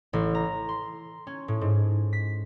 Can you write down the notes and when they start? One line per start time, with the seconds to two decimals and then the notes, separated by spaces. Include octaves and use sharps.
0.13 A1
0.35 A#5
0.69 C6
1.27 C#4
1.48 A2
1.61 G#2
2.13 B6